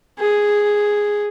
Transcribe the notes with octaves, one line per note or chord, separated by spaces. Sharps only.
G#4